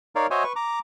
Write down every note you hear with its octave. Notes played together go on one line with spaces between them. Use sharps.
D#4 A#4 C#5 D5 F5
F#4 C5 C#5 D#5 E5 G#5
B4 C#6
A#5 D6